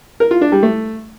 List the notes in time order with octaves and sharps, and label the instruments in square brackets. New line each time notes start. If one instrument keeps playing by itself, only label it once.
[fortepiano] A#4
F4
D4
G3
A3